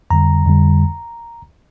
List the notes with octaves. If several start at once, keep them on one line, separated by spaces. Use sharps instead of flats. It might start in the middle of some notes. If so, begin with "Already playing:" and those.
F2 D3 G3 A#5
F2 D3 G3